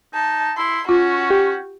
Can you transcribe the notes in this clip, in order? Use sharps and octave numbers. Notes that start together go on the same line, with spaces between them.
D#4 A5
E4 C6
C#4 F4 F#4
G4